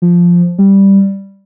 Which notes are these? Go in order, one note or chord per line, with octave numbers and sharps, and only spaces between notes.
F3
G3